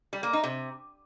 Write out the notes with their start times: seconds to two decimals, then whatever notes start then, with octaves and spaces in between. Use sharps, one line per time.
0.13 G3
0.23 A#3
0.33 D#4
0.44 C3